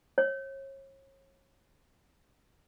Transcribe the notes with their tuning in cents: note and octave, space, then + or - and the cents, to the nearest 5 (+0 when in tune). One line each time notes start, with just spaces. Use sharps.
C#5 -35